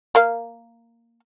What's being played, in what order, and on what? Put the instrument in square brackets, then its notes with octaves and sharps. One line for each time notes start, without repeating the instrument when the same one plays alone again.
[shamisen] A#3 A#4 F5